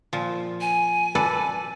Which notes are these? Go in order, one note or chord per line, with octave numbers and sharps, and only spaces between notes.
A#2 F3
G#5
A4 B4 D5